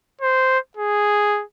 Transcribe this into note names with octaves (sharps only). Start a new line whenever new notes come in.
C5
G#4